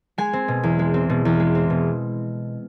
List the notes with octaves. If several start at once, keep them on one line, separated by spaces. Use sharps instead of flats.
G#3 G#5
C4
B2
E2
G#3
C4
B2
E2
G#3
C4
B2